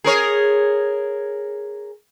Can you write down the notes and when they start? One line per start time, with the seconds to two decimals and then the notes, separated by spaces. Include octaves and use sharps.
0.04 G#4 A#4 C#5